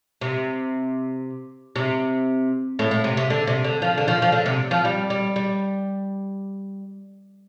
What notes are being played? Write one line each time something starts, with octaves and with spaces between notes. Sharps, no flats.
C3
C3
A2
A2
C3
C3
D3
C3
D3
F3
D3
F3
F3
D3
C3
F3
G3
G3
G3